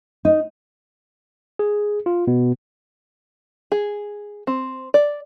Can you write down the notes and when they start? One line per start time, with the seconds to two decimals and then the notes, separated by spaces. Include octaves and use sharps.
0.25 D#4
1.59 G#4
2.06 F4
2.27 B2 B3
3.72 G#4
4.47 C4
4.94 D5